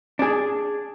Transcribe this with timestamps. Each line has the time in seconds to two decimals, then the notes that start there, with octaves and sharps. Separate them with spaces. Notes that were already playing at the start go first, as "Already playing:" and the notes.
0.19 D4 G#4